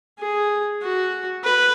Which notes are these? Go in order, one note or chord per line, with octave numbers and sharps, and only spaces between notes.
G#4
F#4
B4